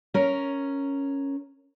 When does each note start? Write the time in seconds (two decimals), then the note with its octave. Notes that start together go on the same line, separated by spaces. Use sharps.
0.14 C#4 A#4